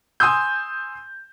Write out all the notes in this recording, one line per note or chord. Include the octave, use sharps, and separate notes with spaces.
G#5 C6 D#6 E6 G6